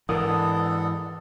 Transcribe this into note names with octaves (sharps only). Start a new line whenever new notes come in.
G#2 E3 B3 D4 A4 A#4 F#5 D#6